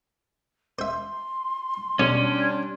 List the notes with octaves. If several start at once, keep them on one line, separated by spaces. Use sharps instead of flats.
C5 E5 C6
B1 G3 C#4 D4